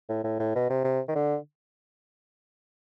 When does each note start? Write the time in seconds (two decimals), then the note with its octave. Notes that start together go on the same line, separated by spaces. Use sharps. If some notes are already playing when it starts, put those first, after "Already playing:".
0.09 A2
0.24 A2
0.39 A2
0.55 B2
0.70 C3
0.84 C3
1.08 D#3
1.15 D3